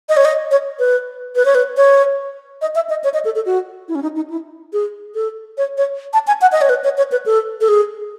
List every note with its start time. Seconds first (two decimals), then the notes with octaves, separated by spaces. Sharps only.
0.09 D#5
0.17 C#5
0.25 D#5
0.51 C#5
0.79 B4
1.36 B4
1.45 C#5
1.55 B4
1.77 C#5
2.62 D#5
2.75 E5
2.89 D#5
3.04 C#5
3.14 D#5
3.25 A4
3.36 A4
3.46 F#4
3.88 E4
3.95 C#4
4.02 D#4
4.16 D#4
4.30 E4
4.73 G#4
5.15 A4
5.58 C#5
5.78 C#5
6.13 A5
6.27 G#5
6.41 F#5
6.52 D#5
6.61 C#5
6.69 B4
6.84 C#5
6.98 C#5
7.12 B4
7.26 A4
7.61 A4
7.68 G#4